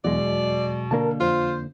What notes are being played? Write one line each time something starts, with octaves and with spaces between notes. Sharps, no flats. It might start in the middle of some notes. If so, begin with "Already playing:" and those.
E2 B2 F#3 G#3 D5
D3 A#3 D4 A#4 A5
F2 F4 C5